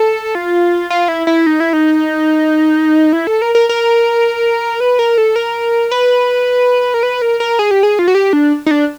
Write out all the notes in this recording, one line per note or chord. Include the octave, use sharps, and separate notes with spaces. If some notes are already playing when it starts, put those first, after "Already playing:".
Already playing: A4
F4
F4
E4
E4
D#4
E4
D#4
E4
A4
A#4
A#4
A#4
B4
A#4
A4
A#4
B4
A#4
B4
A#4
A#4
G#4
G4
G#4
F4
F#4
G4
D4
D#4
D4